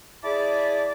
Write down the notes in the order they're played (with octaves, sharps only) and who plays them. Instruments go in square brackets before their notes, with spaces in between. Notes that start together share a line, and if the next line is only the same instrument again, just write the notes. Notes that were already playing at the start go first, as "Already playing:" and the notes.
[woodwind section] E4 G#4 D5 A5 B5 D6